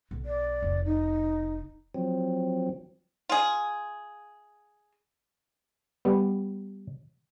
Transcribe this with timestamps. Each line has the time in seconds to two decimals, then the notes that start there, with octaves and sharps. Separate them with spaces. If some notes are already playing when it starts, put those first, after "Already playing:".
0.11 B1
0.25 D5
0.62 F1
0.85 D#4
1.95 F3 F#3 C4
3.29 F4 G#4
6.05 G3 B3